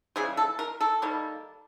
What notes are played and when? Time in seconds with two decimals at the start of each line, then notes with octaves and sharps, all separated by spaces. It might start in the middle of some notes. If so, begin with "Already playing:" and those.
0.16 C#3 E3 G3 G#4
0.37 A4
0.59 A#4
0.81 A4
1.02 D#3 G3 A#3